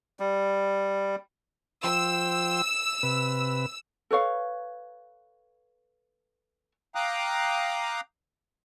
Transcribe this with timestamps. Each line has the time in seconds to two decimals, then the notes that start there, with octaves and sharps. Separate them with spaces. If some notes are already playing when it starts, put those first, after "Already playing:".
0.20 G3
1.84 F3 C5 G5 E6
3.03 C3 B4
4.11 A4 B4 C#5 F5
6.95 F5 G5 A#5 D6 D#6 F#6